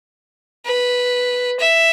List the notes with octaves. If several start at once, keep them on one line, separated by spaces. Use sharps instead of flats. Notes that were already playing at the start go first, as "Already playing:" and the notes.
B4
E5